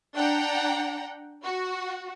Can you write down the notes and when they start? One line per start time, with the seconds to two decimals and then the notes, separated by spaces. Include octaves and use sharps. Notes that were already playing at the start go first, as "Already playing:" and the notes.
0.15 D4 F#5 G5 A#5
1.43 F#4